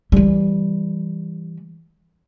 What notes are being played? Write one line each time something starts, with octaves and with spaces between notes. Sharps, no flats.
E3 G3